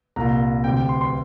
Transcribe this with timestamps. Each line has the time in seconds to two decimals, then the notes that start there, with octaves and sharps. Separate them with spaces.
0.16 C2 A#2 A#5
0.64 D2 C3 G5
0.77 G5
0.89 C6
1.01 C6